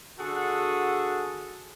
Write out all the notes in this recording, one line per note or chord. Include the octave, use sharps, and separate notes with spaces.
D3 F#4 G#4 A4 F#5